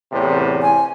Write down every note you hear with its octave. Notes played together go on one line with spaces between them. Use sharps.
E2 A2 C3
G#5